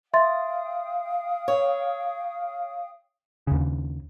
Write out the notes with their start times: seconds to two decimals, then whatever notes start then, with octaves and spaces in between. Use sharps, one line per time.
0.14 E5 F5 G5 C6 D#6 A6
1.48 C#5
3.47 D#2 C#3